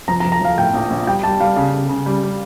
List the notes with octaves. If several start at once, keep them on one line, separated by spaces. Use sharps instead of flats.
F3 A#5
A#5
F3
A#5
F3 F5
A2 G5
A#1
A#1
G3 G5
G3 A5
G3 F5
C#3 F5
C#3
C#3
G3
G3